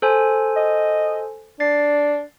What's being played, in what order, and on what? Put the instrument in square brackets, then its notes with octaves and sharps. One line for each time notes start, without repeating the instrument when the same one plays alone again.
[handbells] A4 C5 G#5
[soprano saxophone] D#5
[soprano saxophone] D4 [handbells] A6 C7